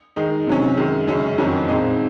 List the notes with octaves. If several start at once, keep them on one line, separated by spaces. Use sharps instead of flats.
D#3 G#3 D#4
C3 F#3 C#4
F#2 D#3 G#3
F#2 C#3 G#3 C#4
F2 D#3 F#3 C#4
A#2 G#3 C4 D#4